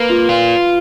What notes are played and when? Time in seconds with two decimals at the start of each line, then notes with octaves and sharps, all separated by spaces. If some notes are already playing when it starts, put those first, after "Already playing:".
Already playing: A#3 B4
0.09 F4
0.29 F4